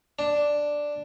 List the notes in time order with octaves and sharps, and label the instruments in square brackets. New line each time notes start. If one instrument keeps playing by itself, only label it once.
[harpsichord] D4